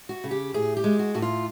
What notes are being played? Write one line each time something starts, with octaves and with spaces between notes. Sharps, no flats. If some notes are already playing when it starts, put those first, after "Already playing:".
F#4
C#3
G4
A2 G#4
G4
G#3
F#4
A2 F#4
F4